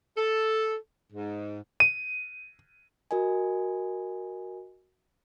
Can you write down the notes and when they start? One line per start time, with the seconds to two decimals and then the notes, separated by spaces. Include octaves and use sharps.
0.18 A4
1.12 G#2
1.80 D#7
3.11 F#4 A#4 D#5 G#5